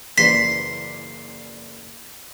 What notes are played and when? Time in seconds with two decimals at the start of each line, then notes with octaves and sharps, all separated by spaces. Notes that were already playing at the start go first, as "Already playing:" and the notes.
0.18 F#1 E3 D5 C6 B6